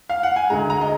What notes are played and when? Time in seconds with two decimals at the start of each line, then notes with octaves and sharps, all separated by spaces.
0.09 F5
0.23 F#5
0.36 G#5
0.50 D2 D3 G#3 A#5
0.70 A#5
0.81 D#5